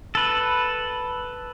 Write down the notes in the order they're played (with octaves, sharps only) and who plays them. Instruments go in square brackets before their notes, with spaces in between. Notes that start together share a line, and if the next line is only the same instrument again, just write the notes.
[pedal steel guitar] A4 B4